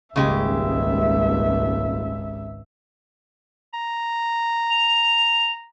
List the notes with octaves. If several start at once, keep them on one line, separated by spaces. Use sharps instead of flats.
D#1 G#1 C#2 C#3 G#3 G4 E5
A#5
F7